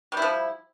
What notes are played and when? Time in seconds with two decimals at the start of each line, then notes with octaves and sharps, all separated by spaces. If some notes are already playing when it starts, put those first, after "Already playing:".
0.12 G3
0.17 E4
0.22 F3